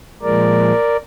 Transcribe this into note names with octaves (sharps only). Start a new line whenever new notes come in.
A#2 F3 G#3 A#4 D5